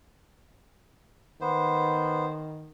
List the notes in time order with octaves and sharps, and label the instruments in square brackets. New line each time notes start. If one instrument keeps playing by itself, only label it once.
[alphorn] D#3 [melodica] B3 C5